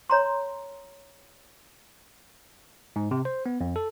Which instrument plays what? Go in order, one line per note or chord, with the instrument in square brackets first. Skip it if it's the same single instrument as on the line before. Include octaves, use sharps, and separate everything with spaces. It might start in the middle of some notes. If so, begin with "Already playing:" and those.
[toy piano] C#5 A#5 C6
[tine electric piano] G#2
C3
C5
B3
F2
A4